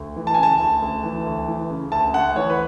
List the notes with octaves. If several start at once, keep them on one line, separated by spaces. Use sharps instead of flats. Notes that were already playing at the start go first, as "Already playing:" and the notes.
Already playing: D2
E3
A5
G#5
C#3
A5
D2
D2
E3
D2
E3
C#3
D2 A5
D2 F#5
E3 C#5
B4